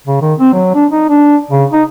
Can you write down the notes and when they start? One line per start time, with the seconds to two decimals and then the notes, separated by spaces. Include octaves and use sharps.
0.07 C#3
0.21 D#3
0.39 C4
0.53 F#3
0.75 D4
0.91 D#4
1.09 D4
1.51 C#3
1.73 D#4